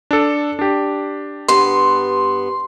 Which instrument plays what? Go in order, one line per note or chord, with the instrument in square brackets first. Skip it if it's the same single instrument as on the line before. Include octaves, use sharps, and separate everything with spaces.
[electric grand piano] D4 A4
D4 G4
[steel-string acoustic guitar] G2 B3 [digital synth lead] C6